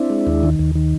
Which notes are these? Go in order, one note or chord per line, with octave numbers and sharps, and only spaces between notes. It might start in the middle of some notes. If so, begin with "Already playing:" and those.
Already playing: C4 D4 E4
G#3
D#2
D#3
D#2
D#3